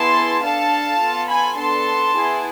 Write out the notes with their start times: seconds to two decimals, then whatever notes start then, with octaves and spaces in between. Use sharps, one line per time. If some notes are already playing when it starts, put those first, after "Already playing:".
Already playing: B3 E4 G#4 A5 C6
0.44 D4 A4 F5 A5
1.01 B3 F4 A4
1.29 G#5 B5
1.58 B3 D4 A4 A5 C6
2.16 B3 E4 G#4